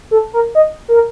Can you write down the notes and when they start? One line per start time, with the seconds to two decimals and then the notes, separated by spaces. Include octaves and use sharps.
0.11 A4
0.33 A#4
0.55 D#5
0.88 A#4